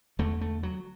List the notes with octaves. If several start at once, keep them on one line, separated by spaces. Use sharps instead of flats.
E2 D3 A3
A3
F#3